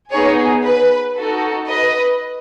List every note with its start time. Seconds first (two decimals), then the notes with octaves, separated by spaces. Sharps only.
0.11 B3 D#4 G#4 C#5
0.65 B4
1.16 D#4 F#4 A4
1.69 B4 D#5